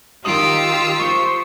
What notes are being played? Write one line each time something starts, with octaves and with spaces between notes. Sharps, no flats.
D#3 F4 G4 D#6 E6 D7
G4 C5 C#6 C#7